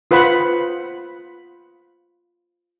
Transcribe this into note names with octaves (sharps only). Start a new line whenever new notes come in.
F4 B4 C5 F#5 B5